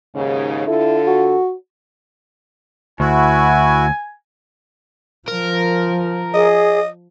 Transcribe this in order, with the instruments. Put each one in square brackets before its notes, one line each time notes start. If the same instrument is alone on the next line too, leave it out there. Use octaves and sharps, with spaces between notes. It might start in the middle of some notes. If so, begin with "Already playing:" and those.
[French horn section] D#2 G#2 C#3
[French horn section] D3 F4 A4 [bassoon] E4
[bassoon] F#4
[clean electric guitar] D2 [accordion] E4 F#4 [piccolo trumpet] G#5
[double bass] F3 [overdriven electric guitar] A#4
[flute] G#4 [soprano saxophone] D#5